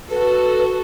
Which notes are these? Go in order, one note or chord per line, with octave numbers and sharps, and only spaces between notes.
F#4 A4 B4